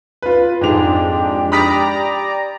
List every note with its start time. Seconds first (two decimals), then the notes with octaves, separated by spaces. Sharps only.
0.22 F4 B4
0.61 F2 G#2 G#3 D4 G4 F7
1.52 D5 A#5 B5 D#6 B6